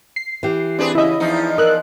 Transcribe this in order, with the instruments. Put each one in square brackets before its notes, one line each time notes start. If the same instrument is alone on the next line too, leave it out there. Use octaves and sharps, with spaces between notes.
[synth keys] C7
[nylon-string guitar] E3 G4
[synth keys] C4 [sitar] D4 G#4 B4
[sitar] C#3 E5 [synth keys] E4 D#5
[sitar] E2 F3 D#4
[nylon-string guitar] A#4 [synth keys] D#5 E6 F#6